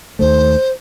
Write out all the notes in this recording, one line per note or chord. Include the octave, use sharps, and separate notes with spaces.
D#2 D#3 A3 C5